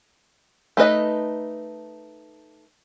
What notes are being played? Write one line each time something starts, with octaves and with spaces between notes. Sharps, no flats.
A3 D#4 B4 D#5